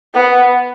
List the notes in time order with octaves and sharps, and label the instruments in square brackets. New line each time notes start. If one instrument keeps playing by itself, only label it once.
[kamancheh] B3